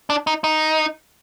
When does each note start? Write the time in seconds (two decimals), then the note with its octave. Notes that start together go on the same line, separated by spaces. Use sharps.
0.10 D4
0.27 D#4
0.44 D#4